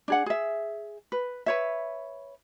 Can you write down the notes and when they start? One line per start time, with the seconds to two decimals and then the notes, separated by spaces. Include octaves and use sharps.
0.08 D4 G#4 F#5
0.26 G#4 E5
1.12 B4
1.46 B4 C#5 E5